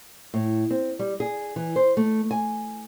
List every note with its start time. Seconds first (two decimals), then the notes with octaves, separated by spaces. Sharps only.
0.34 A2
0.71 C4
0.99 G3
1.20 G#4
1.56 E3
1.76 C5
1.97 A3
2.31 G#5